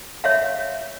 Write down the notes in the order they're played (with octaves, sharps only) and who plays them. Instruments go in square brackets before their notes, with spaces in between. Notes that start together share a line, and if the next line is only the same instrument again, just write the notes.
[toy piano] C#5 E5 F5